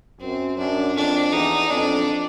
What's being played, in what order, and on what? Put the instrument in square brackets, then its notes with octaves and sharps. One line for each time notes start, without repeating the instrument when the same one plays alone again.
[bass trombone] F#2 [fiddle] C4
[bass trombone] F#2 [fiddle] D4
[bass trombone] F2 [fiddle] D4
[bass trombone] E2 [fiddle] D#4
[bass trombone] F2 [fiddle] D4